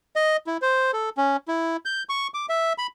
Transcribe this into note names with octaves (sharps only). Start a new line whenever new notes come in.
D#5
E4
C5
A4
C#4
E4
G6
C#6
D6
E5
B5